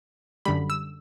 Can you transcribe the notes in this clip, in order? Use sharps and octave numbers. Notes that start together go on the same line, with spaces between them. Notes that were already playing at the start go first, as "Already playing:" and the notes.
F#2 D3 G3 B5
E6